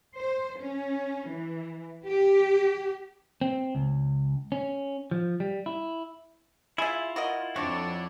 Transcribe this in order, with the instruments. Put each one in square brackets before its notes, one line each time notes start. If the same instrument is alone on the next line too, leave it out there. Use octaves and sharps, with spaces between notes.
[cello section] C5
C#4
E3
G4
[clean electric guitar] C4
C#2
C#4
F3
G3
E4
[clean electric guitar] E4 F4 [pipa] G#4 E5
[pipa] F#4 A#4 D#5
[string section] F2 D4 [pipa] C4 [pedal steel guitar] F#4 C#5 D5